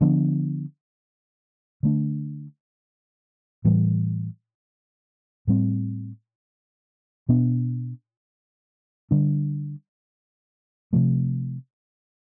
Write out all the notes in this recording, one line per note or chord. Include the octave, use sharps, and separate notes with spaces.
D3 F3 B3 D4
D3 A3 D4
A2 E3 G3
A2 G3 C4
B2 B3 D4
D3 G3 D4
C3 F3 A3